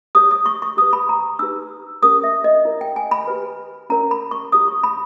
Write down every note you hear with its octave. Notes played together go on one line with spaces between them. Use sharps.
G4 C#5 D#6
D#6
C#6
C#6
G4 B4 D#6
B5
A#5
D#4 G4 B4 E6
C#4 G4 A#4 C#5 D#6
E5
D#5
E4 A#4 C#5
G5
G#5
B5
G4 B4
C#4 E4 A#4 C#5 A#5
B5
C#6
E4 G4 C#5 D#6
C#6
B5